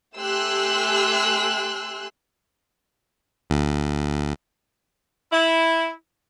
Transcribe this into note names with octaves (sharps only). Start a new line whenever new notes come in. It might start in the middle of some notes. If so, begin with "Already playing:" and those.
A3 G4 G#5 C6 E6 F#6
D2
E4